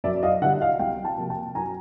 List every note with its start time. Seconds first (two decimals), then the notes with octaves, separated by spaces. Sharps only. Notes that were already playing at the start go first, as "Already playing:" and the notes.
0.04 F#2 D5 E5
0.23 D#5 F5
0.42 D3 E5 F#5
0.45 G3
0.61 D#5 F5
0.79 C2 F5 G5
1.05 G5 A5
1.17 C3 F3 A#3
1.30 G5 A5
1.55 F#2 G#5 A#5